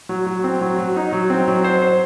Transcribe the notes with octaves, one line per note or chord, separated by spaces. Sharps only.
F#3
F#3
C4
F#3
F#3
D#4
F#3
C4
F#3
C5
C5